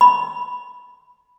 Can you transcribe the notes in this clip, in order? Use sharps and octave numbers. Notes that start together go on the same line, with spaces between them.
B5